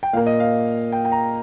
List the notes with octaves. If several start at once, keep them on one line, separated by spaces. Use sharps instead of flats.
G5
A#2 A#3 F5
D#5
F5
G5
G5
A#5